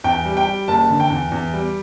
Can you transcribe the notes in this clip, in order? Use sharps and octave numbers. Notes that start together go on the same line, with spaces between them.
E2 G5
G3
G5
G3
F#1 A5
D3
G5
E2
E2
G3